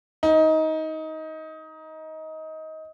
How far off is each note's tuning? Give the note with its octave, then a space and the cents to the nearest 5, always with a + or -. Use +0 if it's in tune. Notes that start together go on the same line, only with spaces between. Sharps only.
D#4 +20